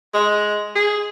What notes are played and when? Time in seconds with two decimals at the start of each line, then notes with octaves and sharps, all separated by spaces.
0.14 G#3
0.75 G#4